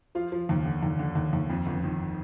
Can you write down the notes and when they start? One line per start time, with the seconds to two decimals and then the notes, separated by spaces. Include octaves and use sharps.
0.15 F3 F4
0.32 F3
0.49 D#2
0.65 D3
0.83 D#2
0.99 D3
1.15 D#2
1.33 D#2
1.50 F2
1.66 G1
1.84 D#3